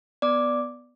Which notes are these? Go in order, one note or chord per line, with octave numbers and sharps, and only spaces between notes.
B3 D5 D6